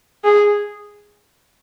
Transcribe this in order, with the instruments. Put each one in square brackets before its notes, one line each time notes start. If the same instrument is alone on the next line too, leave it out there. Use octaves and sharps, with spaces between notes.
[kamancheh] G#4